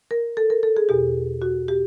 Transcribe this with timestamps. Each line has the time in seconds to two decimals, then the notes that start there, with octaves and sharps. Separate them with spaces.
0.11 A#4
0.37 A4
0.50 A#4
0.63 A4
0.77 G#4
0.89 E2 B2 G4
1.42 F#4
1.68 G4